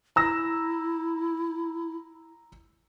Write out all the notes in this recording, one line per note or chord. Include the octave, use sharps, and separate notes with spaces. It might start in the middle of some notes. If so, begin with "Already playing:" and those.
E4 A#5 E6 A#6